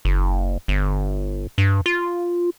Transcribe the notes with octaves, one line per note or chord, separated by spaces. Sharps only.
F#1
G1
G2
F4